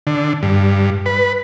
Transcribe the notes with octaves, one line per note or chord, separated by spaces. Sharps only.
D3
G2
B4